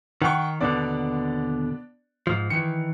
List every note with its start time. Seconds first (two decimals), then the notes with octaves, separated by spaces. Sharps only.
0.22 D#3 F#5 G5 C#6
0.60 D#2 B2 D3 B3 D4 D5
2.27 G#2 F3
2.50 D#3 E3 C#7